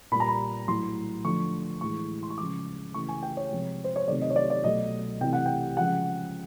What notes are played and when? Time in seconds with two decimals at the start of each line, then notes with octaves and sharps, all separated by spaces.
0.12 A#2 G3 B5
0.20 A#5
0.28 B5
0.68 A2 F#3 A3 C6
1.25 D3 F3 A3 C#6
1.81 A2 E3 G#3 C#6
2.23 C6
2.30 C#6
2.38 C#3 F3 G#3 D6
2.94 C#3 E3 A3 C#6
3.09 G#5
3.23 G5
3.37 C#5
3.51 C3 F3 G#3
3.84 C5
3.96 C#5
4.08 C3 D#3 F#3 A3 D5
4.22 D#5
4.30 C#5
4.36 D5
4.50 D5
4.64 B2 F#3 A3 D#5
5.21 C3 E3 A3 G5
5.33 F#5
5.46 G5
5.77 C#3 F3 G#3 F#5